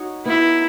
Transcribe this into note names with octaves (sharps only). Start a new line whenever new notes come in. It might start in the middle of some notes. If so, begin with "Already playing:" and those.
Already playing: D#4 F#4 C#5
B3 D#4 E4 F#4 C#5